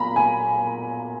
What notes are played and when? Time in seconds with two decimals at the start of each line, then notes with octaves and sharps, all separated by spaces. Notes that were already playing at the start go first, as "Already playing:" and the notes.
Already playing: B1 A#2 A#5 B5
0.16 G#5